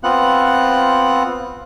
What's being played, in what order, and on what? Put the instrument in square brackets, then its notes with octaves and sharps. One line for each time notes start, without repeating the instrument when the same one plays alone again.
[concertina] B3 C4 F4 F#5 F#6